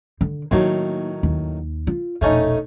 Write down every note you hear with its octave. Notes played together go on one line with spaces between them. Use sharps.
D3
A2 D#3 F#3 A#3 D#4
D#2
F4
E1 A#1 A3 C#4 D#4